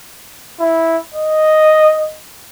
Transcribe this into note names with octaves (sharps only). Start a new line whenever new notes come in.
E4
D#5